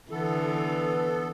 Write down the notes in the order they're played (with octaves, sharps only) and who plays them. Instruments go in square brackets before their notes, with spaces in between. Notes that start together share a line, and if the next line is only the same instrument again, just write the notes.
[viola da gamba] D3 E3 [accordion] B3 A4